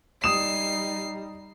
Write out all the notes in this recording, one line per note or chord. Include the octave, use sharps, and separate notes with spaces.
G3 D#4 D#6 C7 E7